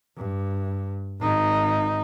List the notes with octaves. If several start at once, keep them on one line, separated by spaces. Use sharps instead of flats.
G2
G#1 D#4